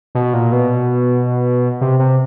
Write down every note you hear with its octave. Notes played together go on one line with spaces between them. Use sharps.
B2
A#2
B2
C3
C3